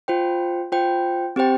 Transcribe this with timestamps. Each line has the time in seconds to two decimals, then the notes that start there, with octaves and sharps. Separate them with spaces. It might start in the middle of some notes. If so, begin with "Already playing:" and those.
0.08 F4 C5 G5
0.72 F4 C5 G5
1.36 C4 G4 C5 G5